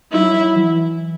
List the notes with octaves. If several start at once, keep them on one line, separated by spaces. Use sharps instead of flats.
F#3 E4
F#3
E3